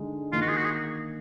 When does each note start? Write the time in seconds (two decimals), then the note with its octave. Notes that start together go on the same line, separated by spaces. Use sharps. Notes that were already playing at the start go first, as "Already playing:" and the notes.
Already playing: D3 G#3 D#4
0.32 D#3 A#3 D#4 F4
0.41 F#4
0.48 G#4
0.57 F#4
0.65 G#4